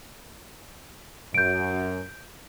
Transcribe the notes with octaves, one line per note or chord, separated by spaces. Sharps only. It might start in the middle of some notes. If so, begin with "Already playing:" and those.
F#2 G6 D7